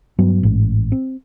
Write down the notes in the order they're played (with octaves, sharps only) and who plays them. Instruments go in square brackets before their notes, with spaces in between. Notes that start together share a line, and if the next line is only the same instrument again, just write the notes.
[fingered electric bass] G2 F#3 B3
A1 G#2
C4